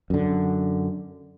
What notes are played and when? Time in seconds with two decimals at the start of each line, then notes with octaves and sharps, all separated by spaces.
0.10 F#2 D3